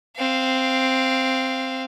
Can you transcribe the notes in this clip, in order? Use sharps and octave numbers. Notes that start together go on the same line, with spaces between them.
C4 F5